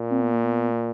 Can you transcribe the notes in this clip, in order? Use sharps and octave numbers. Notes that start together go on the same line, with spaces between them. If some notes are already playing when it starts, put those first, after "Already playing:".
Already playing: A#2
C4
B3
A#3
B3
A#3